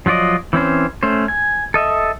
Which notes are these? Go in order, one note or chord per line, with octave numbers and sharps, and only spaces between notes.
F3 F#3 F4 D5 D#5
E3 C4 C#4 C5
A3 C#4 C5
G#5
A4 D#5 E5